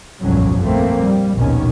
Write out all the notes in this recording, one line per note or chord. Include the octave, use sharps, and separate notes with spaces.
G1 C2 F2 A#2 F#3 C#4
A#1 A3 A#3 C4
G3
A#1 D#2 B2 D#3 C#4